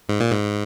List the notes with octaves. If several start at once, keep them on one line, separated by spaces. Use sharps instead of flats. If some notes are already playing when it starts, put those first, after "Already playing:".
G#2
A#2
G#2